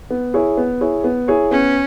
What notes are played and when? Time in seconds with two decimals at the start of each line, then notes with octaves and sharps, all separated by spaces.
0.11 B3
0.34 E4 G#4 C#5
0.57 B3
0.81 E4 G#4 C#5
1.04 B3
1.28 E4 G#4 C#5
1.51 B3 C#4